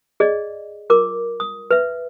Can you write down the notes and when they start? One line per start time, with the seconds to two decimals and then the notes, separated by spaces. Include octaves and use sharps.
0.20 G#4 D5 D#5
0.90 F4 A#4 D6
1.40 D#6
1.71 B4 E5